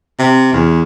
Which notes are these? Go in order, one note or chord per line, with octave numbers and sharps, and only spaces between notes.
C3
E2